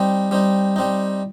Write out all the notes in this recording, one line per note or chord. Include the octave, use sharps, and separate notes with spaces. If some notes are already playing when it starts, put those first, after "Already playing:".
Already playing: G3 C4 D#4
G3 C4 D#4
G3 C4 D#4